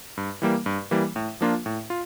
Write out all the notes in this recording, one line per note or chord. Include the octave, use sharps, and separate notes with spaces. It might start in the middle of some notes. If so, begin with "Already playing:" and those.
G2
E3 G3 A#3
G2
E3 G3 A#3
A2
F3 A#3 D4 F4
A2
F4